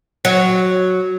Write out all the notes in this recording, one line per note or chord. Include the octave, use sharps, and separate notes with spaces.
F#3